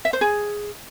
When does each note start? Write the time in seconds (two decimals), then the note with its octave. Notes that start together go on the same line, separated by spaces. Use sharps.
0.05 E5
0.13 C5
0.21 G#4